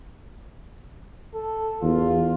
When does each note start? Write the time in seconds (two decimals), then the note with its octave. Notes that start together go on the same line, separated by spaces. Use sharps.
1.35 A4
1.82 E2 F4